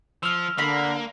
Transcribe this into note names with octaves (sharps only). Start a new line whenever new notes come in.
F3 E6 F6
D3 A#3 A#4 B5